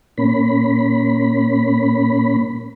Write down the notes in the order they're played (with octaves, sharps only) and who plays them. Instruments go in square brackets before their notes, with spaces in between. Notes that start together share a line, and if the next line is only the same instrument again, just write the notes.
[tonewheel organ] A#2 A#3 C#4 B5